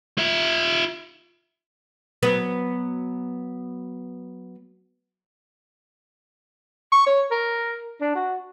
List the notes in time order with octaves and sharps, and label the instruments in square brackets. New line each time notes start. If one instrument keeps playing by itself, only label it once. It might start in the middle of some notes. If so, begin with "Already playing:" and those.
[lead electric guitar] F4 E5
[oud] F#3 B3 B4
[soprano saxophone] C#6
C#5
A#4
D4
F#4